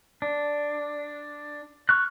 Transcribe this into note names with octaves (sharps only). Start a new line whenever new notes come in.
D4
C#6 F6 F#6